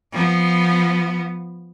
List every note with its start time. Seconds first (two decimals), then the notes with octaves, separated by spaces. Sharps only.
0.12 F3 B3